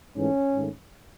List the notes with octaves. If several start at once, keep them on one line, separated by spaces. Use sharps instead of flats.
G#2 E3 A3 C#4
G#2 D#3 A3